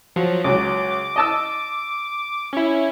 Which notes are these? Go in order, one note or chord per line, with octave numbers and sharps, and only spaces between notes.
F3 F#3
C#2 F#3 D6
D#5 A5 E6
C#4 E4